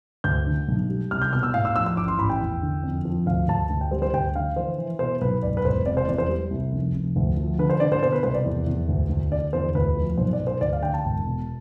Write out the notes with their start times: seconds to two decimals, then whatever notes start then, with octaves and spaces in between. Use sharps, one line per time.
0.24 D2 G6
0.47 D3
0.68 B1
0.89 G3
1.11 C2 F6
1.22 G6
1.32 B2 F6
1.43 E6
1.54 A2 F5
1.65 E6
1.76 F3 E6
1.86 E6
1.97 A1 D6
2.08 C6
2.18 A1 B5
2.29 G5
2.41 E2
2.62 D3
2.83 F2
3.05 F3
3.26 D2 F5
3.48 D2 A5
3.70 D2
3.81 G5
3.91 G3 C5
4.02 C5
4.14 D2 G5
4.35 D3 F5
4.56 E3 C5
4.78 E3
4.99 B2 C5
5.21 B1 B4
5.43 E1 D5
5.57 B4
5.65 E1 C5
5.86 C3 D5
5.97 C5
6.08 E2 D5
6.18 C5
6.29 G3
6.50 C2
6.73 F1
6.94 F1
7.16 D2
7.37 F3
7.59 D3 B4
7.70 C5
7.80 D3 D5
7.92 C5
8.02 B2 C5
8.12 B4
8.23 C2 C5
8.34 D5
8.45 E2
8.67 E2
8.89 D2
9.10 D2
9.31 D3 D5
9.53 E2 C5
9.75 D2 B4
9.97 F3
10.17 B1 C5
10.33 D5
10.39 B1
10.47 C5
10.61 D2 D5
10.73 F5
10.83 D3 G5
10.94 A5
11.05 E1
11.25 B2